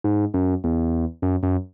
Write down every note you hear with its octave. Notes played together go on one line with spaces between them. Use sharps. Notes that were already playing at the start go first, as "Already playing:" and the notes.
G#2
F#2
E2
F#2
F#2